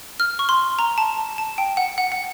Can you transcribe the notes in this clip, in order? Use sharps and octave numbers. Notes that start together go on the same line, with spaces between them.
F6
C#6
C6
A#5
A5
A5
G5
F#5
F#5
F#5